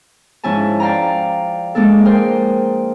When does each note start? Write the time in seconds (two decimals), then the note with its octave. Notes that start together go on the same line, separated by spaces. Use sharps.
0.43 G#2 F3 C#4 E4 G#5 A5
0.80 D5 F5 G5 A#5
1.75 G#3 A#3 D4 A4
2.05 G#4 A#4 C5 G5 C6